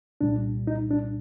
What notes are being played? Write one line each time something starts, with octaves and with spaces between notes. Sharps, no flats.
C2 A#2 G3 D4
D#4
D4